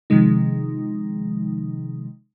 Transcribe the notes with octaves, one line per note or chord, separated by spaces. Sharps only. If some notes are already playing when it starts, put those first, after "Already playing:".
C3 D#3 F3 G#3 D#4